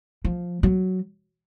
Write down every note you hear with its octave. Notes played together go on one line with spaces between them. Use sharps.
F3
F#3